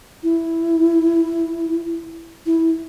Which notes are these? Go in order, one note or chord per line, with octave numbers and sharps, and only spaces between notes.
E4
E4